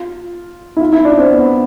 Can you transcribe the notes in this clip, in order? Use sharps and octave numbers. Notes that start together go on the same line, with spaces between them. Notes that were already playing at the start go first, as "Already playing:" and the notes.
Already playing: F4
E4
F4
E4
D4
C4
B3